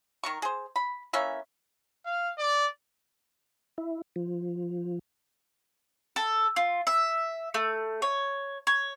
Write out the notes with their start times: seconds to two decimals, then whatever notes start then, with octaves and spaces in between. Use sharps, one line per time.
0.24 D#3 A#4 C#6
0.42 G#4 C5
0.76 B5
1.13 E3 A#3 C#4 E5
2.06 F5
2.38 D5
3.78 E4
4.16 F3
6.16 A4
6.56 F4
6.87 E5
7.54 A3
8.02 C#5
8.67 C#5